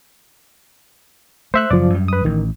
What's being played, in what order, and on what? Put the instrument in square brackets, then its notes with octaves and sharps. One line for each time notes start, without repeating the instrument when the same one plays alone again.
[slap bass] A3 [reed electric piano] C5 E5 F#6
[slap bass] F#2 C#3 F#3 [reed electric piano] F3 D5
[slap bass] F#2 G3
[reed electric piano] B4 D#6
[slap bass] A1 [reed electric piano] D#3